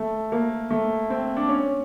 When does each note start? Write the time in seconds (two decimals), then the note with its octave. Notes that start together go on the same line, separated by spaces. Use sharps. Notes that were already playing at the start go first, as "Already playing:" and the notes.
Already playing: A3
0.32 A#3
0.71 A3
1.10 C4
1.37 D4
1.49 C#4